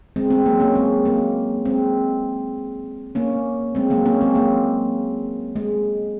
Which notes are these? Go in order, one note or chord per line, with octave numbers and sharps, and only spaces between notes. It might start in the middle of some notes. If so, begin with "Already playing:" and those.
G#3 C4
G#3 C4
F#3 A#3
A#3 C#4
G#3 C4
F#3 A#3
G#3 C4
A#3 C#4
G#3 C4
F#3 A#3
A#3 C#4
G#3 C4
F#3 A#3
G#3